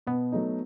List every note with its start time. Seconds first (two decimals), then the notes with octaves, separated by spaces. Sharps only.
0.07 B2 B3
0.32 F#3 A3 D#4